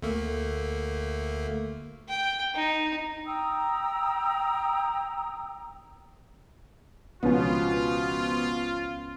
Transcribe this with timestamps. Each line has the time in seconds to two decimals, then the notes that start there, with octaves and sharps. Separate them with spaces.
0.02 D2 A3 A#3
2.09 G5
2.55 D#4
3.25 G5 A#5 D#6 E6
7.23 C#2 B2 F3 B3 C#4 F4